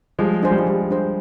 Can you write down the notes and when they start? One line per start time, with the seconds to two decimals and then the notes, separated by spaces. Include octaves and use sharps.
0.19 F3 G3 G#3
0.43 G#3 D4 G#4 C5
0.51 G3
0.59 F3 G#3
0.67 G3
0.91 D4 G#4 C5